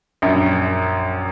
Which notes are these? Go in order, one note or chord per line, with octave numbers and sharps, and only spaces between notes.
A#1 F#2